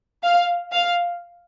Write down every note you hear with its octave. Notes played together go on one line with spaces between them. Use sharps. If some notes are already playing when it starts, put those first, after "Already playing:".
F5
F5